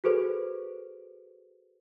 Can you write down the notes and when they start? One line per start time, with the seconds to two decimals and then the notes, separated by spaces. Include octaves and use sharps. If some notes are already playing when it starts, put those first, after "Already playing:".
0.04 F#4 G#4 A4 B4 C5